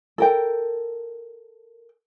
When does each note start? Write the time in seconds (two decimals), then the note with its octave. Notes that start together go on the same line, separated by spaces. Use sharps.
0.18 A4 A#4 G5